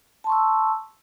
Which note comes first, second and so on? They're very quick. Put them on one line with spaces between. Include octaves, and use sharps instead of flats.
A5 C6 C#6 E6